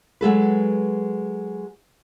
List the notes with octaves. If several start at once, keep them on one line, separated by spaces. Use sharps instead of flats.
F#3 G#3 A4 B4